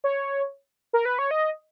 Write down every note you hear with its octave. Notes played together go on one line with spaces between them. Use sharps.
C#5
A#4
B4
C#5
D#5